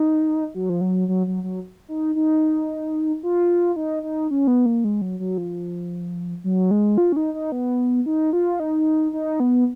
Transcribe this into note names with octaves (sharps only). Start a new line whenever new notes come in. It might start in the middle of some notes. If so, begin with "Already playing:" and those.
Already playing: D#4
F#3
F3
F#3
F#3
F#3
F#3
D#4
D#4
F4
D#4
D#4
C#4
B3
A#3
G#3
F#3
F#3
F3
F#3
G#3
F4
C#4
D#4
D#4
B3
D#4
F4
D#4
D#4
B3